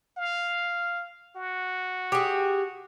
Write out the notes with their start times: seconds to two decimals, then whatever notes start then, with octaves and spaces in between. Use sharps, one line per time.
0.17 F5
1.36 F#4
2.12 G4 G#4